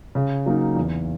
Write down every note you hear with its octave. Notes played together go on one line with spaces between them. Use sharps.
C#3
F#3 A#3 D#4
E2